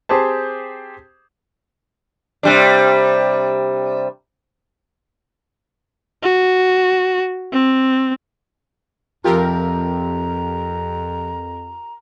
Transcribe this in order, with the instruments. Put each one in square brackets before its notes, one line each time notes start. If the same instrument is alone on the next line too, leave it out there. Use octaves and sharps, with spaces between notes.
[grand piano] C4 G4 G#4 C5 A5
[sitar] C3 G3 D4
[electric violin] F#4
C4
[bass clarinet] F2 [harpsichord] C3 F3 C4 [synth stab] F4 G4 A#4 [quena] A#5